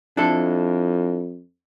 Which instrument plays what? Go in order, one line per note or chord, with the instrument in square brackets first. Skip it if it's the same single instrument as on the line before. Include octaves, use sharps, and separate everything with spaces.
[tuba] F2 [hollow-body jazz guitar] D4 E4 A4